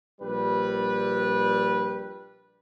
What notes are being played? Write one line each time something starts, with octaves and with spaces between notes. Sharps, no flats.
A#1 G3 B4